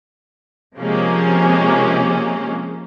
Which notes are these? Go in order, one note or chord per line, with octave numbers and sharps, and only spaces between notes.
C3 F3 G#3 A#3 C#4